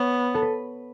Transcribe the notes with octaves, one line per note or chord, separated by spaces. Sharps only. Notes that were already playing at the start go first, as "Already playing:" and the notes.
Already playing: B3 C#5
A4
B4